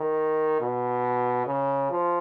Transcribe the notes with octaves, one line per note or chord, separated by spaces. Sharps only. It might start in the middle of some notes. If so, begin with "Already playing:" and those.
Already playing: D#3
B2
C#3
F3